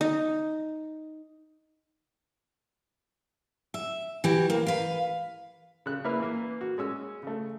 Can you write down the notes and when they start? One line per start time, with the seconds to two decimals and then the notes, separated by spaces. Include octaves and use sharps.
0.01 D#4
3.74 E5
4.24 E3 F#4 G4
4.50 A#3
4.67 B4 F5
5.86 C#3 F#6
6.04 A#3 E4 B4 F6
6.20 E3 A#3
6.61 F#4
6.78 G#3 C#4 E6
7.23 C#3 A3